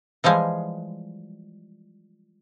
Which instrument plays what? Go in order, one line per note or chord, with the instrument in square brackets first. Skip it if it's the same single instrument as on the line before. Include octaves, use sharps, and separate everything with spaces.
[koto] E3 F3 G3 G#3